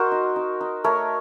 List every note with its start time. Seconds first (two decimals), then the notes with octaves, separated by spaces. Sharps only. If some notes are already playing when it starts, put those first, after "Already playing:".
Already playing: F#4 A#4 C5 D#5
0.12 D#4
0.36 D#4
0.61 D#4
0.84 A3 A#4 C#5